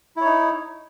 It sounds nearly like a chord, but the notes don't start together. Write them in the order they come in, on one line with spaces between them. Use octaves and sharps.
E4 C#5 D#4